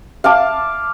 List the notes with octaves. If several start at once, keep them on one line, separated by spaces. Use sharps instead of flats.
F5 A5 D6